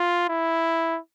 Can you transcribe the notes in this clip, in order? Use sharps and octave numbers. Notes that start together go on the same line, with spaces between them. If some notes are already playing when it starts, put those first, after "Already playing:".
Already playing: F4
E4